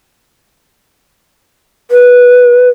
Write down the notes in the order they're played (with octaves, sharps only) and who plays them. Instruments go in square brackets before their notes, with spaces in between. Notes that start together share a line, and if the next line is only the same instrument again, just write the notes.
[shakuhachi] B4